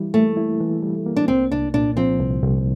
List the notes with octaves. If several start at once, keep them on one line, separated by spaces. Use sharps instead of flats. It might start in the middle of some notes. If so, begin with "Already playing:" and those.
Already playing: E3 G3 E4
A3 A#3
E4
E3
G3
A#3
D4
C2 C4
C2 D4
A#2 D4
F3 C4
C2
C2